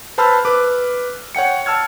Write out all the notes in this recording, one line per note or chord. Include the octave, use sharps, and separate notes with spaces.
B4 C5 A5 B5 E6 F6
B4 D6
C#5 F#5 G5 C#7
A5 E6 F6 G#6